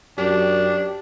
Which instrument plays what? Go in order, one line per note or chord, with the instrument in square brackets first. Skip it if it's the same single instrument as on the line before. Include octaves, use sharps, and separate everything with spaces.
[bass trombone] F#2 [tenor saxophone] D4 [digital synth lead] G4